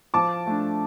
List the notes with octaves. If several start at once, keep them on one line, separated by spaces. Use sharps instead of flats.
F3 A5 D6
A3 D4